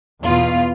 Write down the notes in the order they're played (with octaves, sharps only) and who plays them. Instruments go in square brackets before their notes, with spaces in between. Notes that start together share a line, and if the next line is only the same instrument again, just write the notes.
[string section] E2 B2 F4